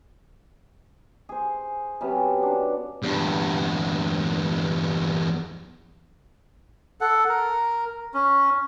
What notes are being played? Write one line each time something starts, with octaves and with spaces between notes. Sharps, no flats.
G#4 C5
C3 F#3 B3 C#4
D4
E2 G2
A4 F#5
A#4
C#4